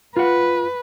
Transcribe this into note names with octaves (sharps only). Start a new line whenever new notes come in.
F4 B4 F#5